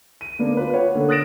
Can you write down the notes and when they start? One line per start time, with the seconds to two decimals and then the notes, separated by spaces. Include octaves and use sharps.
0.21 D#7
0.39 D3 A#3 B3 D4
0.57 F4 B4
0.74 C#5 F#5
0.95 D3 A#3 A4
1.09 D#6 F#6 A6 A#6 D7 E7